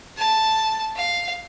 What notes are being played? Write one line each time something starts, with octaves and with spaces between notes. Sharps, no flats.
A5
F5